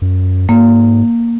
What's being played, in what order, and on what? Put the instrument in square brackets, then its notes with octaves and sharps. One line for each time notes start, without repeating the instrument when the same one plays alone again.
[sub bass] F#2
[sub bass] G#2 [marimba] A#3